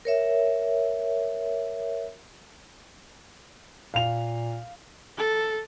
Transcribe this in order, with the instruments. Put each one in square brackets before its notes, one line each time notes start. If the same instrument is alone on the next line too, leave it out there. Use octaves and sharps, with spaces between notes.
[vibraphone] A#4 C#5 E5
[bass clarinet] A#2 [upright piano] F5 F7
[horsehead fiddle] A4